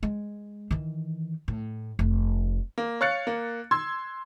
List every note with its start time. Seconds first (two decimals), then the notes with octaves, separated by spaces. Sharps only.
0.03 G#3
0.71 D#3 E3
1.48 A2
1.99 F1 A3
2.78 A#3
3.01 C#5 F5 F#6 A6 C#7
3.27 A#3
3.71 C6 E6 G#6